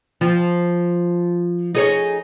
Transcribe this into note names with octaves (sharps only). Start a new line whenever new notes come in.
F3
D#4 G#4 C#5